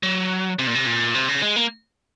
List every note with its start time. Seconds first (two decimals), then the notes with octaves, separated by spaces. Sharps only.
0.03 F#3
0.59 C3
0.67 A#2
0.75 C3
0.87 A#2
1.14 C3
1.28 C#3
1.42 G#3
1.56 A#3